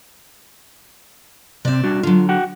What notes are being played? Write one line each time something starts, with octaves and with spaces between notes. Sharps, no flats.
C3 C4 D5 E5
G3 D4 F#4
D3 F#3 F4
F#4 F#5 G5